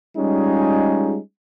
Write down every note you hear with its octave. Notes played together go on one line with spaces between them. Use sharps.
G3 G#3 C#4 D#4 F4 G#4